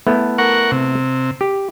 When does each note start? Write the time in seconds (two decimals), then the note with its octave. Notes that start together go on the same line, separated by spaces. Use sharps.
0.07 A3 B3 E4
0.38 A#4 F#5 C#6
0.72 C3
1.41 G4